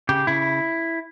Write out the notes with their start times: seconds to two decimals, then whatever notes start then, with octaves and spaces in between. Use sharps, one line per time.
0.09 C#3 G4
0.27 C#3 E4